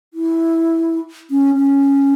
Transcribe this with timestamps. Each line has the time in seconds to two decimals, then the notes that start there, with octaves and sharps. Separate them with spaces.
0.14 E4
1.31 C#4
1.55 C#4